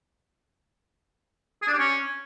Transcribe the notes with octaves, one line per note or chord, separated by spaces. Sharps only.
G#4
D4
G4
C#4